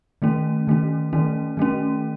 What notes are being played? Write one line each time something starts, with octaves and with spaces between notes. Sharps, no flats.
D#3 A3 C#4
D#3 A3 C#4
D#3 A3 C#4
D#3 A3 C#4